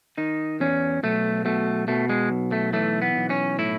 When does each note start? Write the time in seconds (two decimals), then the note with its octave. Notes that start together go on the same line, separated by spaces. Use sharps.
0.18 D#3 D#4
0.60 E2 C#4
1.03 B1 A3
1.45 B2 A3
1.88 B2 A3
2.09 G#3
2.30 B1
2.52 A3
2.73 E3 A3
3.02 B3
3.16 B1
3.30 C#4
3.59 A2 E4